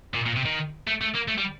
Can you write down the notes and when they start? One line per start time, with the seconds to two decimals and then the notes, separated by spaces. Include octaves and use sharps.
0.15 A#2
0.26 A#2
0.36 C3
0.45 D#3
0.87 A3
1.01 A3
1.15 A#3
1.28 A3
1.38 G3